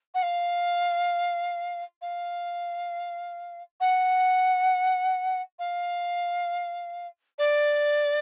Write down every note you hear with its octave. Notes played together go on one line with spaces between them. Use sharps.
F#5
F5
F5
F#5
F5
D5